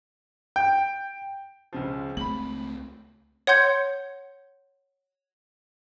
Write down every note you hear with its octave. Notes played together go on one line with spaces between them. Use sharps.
G5
C#2 C#3 F3
C#2 A3 C4 B5 F#7
C#5 F#5 C6 G6 G#6 C#7